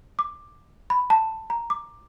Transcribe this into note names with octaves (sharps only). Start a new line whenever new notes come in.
D6
B5
A5
A#5
D6